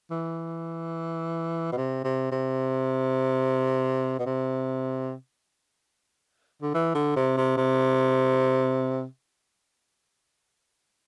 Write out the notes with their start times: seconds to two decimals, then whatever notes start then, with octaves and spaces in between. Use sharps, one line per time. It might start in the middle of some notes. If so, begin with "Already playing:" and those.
0.11 E3
1.73 B2
1.77 C3
2.04 C3
2.32 C3
4.19 B2
4.26 C3
6.63 D3
6.74 E3
6.95 D3
7.16 C3
7.37 C3
7.57 C3